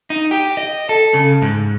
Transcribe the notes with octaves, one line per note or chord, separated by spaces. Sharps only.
D#4
G4
D#5
A4
C#3
G#2